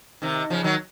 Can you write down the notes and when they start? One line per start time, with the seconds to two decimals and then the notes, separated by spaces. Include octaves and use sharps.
0.22 C3 D#3
0.50 C#3 F3
0.64 D#3 F#3